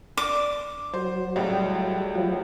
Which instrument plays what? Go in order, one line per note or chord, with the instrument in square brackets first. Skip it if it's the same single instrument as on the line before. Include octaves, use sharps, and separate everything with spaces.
[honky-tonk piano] D4 [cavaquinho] D6
[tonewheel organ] F#3 [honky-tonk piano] C5
[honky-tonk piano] C#2 A2 G3
[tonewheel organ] F3 F#3